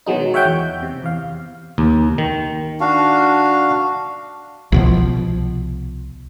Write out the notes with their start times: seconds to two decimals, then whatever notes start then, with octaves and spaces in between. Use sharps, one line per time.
0.06 B2 D#3 F#3 G#3 D#4
0.34 C#5 E5 F#5 G5 G6
0.45 E2
0.83 C3
1.03 E2 F5
1.78 D#2
2.18 D#3
2.80 D4 F#4 F5
4.72 C2 B2 F3